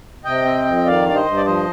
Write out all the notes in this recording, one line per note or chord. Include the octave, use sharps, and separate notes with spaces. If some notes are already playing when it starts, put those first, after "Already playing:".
C3 D#5 G5
C4
F2
D#3 D5 F5
G2 D5
C5 D#5
G2
D5
F3 C5 D#5